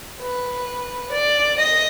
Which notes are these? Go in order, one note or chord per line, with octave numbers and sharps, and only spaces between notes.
B4
D5
D#5